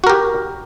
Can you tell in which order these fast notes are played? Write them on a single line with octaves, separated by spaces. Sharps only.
F#4 A#4 G4